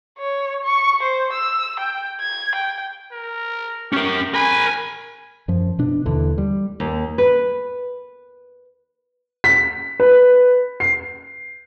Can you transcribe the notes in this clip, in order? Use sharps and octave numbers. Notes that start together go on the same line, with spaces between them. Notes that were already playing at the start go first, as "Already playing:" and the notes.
C#5
C#6
C5
E6
G5
G#6
G5
A#4
C#4 G4 A#4
A#4 G#5 B5
F#2 F3
B2 D4
D#2 D3 E3
G3
D#2
B4
B6
B4
C7